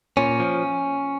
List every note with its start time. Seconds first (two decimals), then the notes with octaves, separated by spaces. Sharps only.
0.17 A#2 C#4
0.40 F3